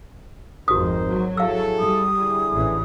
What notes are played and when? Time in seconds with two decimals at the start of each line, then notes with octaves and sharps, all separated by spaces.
0.68 G#1 F2 D#4 F#4 A#4 C5 D#6
1.07 F#3
1.37 E4 G#4 A4 F5 E6
1.79 G3 D#6
2.19 D3 E4 G#4
2.53 A1 E3